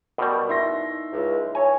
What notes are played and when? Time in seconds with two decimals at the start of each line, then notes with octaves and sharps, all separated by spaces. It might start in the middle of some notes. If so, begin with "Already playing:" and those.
0.18 B2 G3 A#4 C#6
0.49 D#4 E4 E5 C6 A#6
1.12 C#2
1.55 C#5 G#5